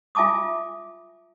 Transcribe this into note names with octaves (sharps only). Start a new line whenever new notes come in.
F4 E5 G#5 A5 D6 D#6